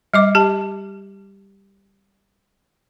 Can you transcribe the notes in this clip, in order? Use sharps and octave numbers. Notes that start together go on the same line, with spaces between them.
G3 D#5 D6
G4 A5